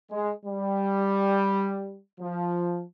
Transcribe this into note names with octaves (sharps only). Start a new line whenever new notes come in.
G#3
G3
F3